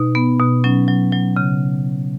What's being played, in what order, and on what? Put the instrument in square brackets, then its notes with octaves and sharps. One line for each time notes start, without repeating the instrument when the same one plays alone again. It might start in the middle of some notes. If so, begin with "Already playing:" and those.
Already playing: [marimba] B2 D#4
B3
B2
F#3 C#4
F#3
F#3
C#3